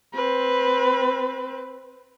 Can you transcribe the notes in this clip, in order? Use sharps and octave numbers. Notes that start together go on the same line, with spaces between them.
C4 B4